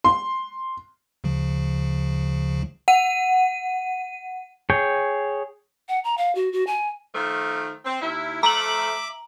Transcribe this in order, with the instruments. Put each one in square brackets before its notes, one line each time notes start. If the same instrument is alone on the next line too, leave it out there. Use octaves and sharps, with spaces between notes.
[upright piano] C6
[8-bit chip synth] D2 C#3 F3
[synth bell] F#5 D#7
[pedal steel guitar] G#4 C#5 G5
[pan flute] F#5
A#5
F5
F#4
F#4
G#5
[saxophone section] D#3 F3 A3
C4
D#2 E4
[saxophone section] F3 A3 [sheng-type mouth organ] E5 D6 [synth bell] A#5 F#7